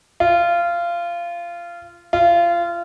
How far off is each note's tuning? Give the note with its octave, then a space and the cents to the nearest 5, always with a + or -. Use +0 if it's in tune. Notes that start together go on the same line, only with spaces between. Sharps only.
F4 -20
F4 -25